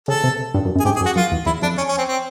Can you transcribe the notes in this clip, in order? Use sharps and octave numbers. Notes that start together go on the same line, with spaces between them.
C#3 A4
C3
G2
F#2
F#2
G#4
G#2 G4
G#4
F#2
F#4
F#2 F4
E2
E2 E4
F2 D4
C#4
C#4
C4
C4